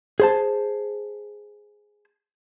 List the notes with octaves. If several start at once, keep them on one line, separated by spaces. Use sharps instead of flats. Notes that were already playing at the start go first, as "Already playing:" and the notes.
G#4 C5 A5